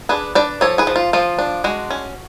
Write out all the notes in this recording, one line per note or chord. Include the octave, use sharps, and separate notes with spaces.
D4 G#4 B4
D4 B4 D5
F3 A4 C#5
G#4 B4
F3
F4
F3 F4
D4
G#3 F#4
C#4